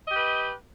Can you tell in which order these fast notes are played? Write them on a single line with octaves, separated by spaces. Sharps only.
D#5 G4 B4